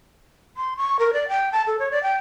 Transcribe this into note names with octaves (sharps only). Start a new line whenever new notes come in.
C6
C#6
A#4
D5
G5
A5
A4
C#5
D5
G5